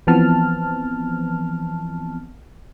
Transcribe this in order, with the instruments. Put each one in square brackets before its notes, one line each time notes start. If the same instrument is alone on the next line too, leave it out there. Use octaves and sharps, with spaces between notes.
[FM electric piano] E3 F3 B3 C4 A5 F6